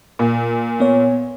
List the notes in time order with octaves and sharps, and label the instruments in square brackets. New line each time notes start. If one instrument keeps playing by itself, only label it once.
[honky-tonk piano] A#2
[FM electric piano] B3 C#5